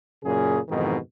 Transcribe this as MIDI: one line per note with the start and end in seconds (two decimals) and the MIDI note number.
0.23 0.59 42
0.23 0.59 46
0.23 0.59 49
0.23 0.59 68
0.69 0.97 41
0.69 0.97 44
0.69 0.97 47
0.69 0.97 51
0.69 0.97 52